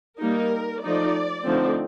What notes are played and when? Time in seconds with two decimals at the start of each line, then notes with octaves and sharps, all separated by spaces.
0.20 G3 A#3 D#4 A#4
0.83 F3 A3 D#4 D5
1.45 D3 F3 A3 C4 D#4